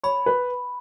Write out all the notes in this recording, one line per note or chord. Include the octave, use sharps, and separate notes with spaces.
C#5 B5
B4